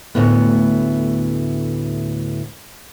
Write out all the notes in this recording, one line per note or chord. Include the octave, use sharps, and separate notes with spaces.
D2 A2 B3